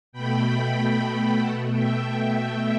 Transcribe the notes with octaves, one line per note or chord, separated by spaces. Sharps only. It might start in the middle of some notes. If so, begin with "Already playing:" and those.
B2 A3 G5 B5
G5 B5
G5 B5
B2 A3 F#5 A5
E5 G5